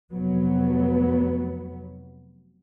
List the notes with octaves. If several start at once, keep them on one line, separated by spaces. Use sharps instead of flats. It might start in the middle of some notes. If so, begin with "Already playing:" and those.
F1 F#3 B3